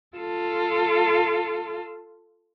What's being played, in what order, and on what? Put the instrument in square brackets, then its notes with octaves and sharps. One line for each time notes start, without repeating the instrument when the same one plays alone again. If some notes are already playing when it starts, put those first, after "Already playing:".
[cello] F4 A4